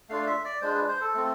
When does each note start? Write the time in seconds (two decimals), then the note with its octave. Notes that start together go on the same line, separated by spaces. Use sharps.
0.09 A3 D4 F4 F5
0.27 E5
0.44 D5
0.61 G#3 D4 F4 C5
0.74 B4
0.88 C5
1.01 A4
1.14 A3 C4 F4